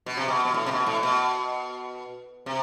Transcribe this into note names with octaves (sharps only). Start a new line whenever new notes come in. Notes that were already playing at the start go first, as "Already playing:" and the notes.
B2
C3
B2
B2
A2
C3
B2
A2
B2
C3